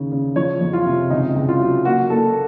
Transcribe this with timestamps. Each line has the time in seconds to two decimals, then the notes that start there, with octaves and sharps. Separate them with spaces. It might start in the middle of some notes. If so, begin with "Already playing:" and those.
Already playing: D#2 C#3
0.12 C#3
0.36 F3 C#5
0.61 F2
0.73 F4
0.86 C3
1.10 C#2 D#4
1.36 C#2
1.49 F4
1.60 F#3
1.85 A#3 F#4
2.10 A#3 A4